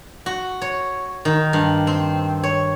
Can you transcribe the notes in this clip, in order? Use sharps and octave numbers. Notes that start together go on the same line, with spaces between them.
F#4
C#5
D#3
G2
C4
C#5